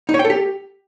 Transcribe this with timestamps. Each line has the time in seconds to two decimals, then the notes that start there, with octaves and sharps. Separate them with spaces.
0.09 D#4
0.14 C#5
0.19 G5
0.25 A4
0.30 G4